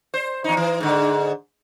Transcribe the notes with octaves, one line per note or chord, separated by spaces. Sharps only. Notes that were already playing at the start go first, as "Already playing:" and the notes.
C5
E2 D#4
E3
G#2 D3